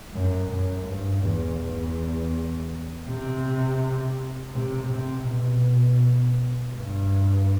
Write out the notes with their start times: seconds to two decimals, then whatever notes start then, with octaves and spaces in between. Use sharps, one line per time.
0.13 F#2
0.51 F#2
0.87 G2
1.24 E2
1.61 E2
3.08 C3
4.55 C3
4.92 C3
5.28 B2
6.74 G2